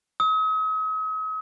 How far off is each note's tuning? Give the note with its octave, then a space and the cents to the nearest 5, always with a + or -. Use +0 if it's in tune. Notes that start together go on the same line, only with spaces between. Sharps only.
D#6 +45